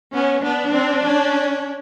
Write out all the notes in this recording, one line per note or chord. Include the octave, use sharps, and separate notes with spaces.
B3 C#4
B3 D4
C4
C#4